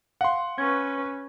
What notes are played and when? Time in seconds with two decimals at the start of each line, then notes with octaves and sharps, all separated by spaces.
0.21 F5 F#5 C6
0.58 C#4 B4 C#6 G#6